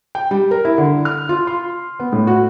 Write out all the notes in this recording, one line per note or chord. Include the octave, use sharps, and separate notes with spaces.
G5
G3
A#4
E4
D3
F6
F4
C6
B3
A2
F#4